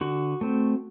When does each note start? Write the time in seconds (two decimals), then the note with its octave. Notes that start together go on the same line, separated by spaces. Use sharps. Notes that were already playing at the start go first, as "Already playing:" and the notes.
0.01 D3 F#4
0.41 A3 C4